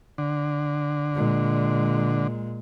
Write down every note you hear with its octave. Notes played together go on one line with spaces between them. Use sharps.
D3
A#2 G#3